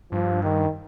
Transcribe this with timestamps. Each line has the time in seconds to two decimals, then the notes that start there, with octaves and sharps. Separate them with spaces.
0.12 G2 F3
0.43 D#3